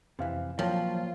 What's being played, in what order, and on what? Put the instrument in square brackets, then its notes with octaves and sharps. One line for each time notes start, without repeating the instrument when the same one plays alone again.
[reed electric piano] F2 F5 [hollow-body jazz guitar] C3 E3
[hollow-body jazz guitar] A#2 A#4 G5 [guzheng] F3 [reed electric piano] F#3 C#5 A5 [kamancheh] F4